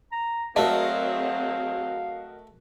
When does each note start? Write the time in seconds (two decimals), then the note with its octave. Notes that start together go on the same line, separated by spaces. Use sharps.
0.12 A#5
0.56 F#3 A3 C4 F#4 G#4 A#4 D#5 F5